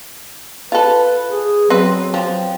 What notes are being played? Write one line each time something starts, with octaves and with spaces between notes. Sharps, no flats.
F4 A4 B4
G#4
F#3 C4 B4
F3 C4